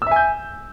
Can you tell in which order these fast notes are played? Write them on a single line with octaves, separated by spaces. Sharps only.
E6 E5 G#5 G6